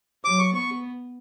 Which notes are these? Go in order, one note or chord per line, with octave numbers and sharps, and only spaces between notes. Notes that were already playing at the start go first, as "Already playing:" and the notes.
F#3 D6
C#6
B3 C#6